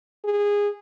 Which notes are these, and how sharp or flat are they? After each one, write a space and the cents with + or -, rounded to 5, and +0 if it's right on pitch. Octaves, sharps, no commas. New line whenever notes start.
G#4 -20